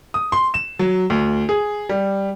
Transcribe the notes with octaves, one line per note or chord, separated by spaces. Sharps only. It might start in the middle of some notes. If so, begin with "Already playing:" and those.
D#6
C6
E7
F#3
D2
G#4
G3